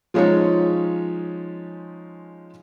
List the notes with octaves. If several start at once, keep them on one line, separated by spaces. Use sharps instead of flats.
F3 G#3 C#4 D#4 F4 C#5